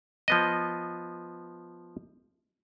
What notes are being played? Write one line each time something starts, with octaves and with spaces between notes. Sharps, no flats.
F3 B3 D#5